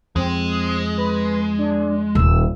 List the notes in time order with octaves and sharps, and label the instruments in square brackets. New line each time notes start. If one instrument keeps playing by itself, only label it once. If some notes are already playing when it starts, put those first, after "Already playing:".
[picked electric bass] F2 [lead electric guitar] G#3 [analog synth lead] C4
[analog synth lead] B4
D4
[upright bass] D#1 [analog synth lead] E6